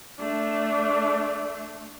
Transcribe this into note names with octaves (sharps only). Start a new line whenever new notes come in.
A3 D4